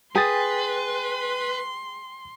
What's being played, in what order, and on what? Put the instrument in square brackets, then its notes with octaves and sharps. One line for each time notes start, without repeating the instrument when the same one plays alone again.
[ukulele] G#4 [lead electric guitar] B4 [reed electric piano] G5 G#5 A6 [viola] C6